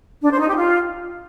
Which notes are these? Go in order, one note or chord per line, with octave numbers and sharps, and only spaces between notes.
D4
C5
D#4
G4
F4